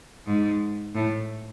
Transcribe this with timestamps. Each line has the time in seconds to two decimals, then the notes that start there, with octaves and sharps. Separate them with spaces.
0.26 G#2
0.95 A2